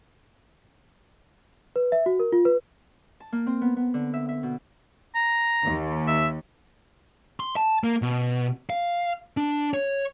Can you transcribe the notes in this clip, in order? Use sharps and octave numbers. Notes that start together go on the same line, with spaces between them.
B4
E5
F#4
A#4
F4
B4
A5
A#3
C4
B3
B3
D3
E5
E5
B2
A#5
D#2
E5
C6
A5
A#3
B2
F5
D4
C#5